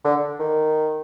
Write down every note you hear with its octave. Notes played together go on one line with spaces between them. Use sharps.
D3
D#3